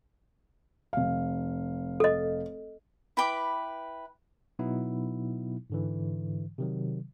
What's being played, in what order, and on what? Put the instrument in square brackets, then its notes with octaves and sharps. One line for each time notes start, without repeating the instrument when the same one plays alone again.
[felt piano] F1 F5
[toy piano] A4 D#5
[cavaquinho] E4 B4 G5 D6
[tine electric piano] B2 F#3 B3 D#4 E4
G#2 D3 E3
C3 D#3 F#3